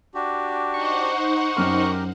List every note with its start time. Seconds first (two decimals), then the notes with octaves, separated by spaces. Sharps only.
0.15 D4 F#4 G4
0.74 D#4 C5 F#5 C#6
1.57 F#2 G4 A#4 F6